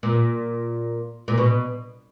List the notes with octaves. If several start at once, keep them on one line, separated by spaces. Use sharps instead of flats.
A#2
A#2
B2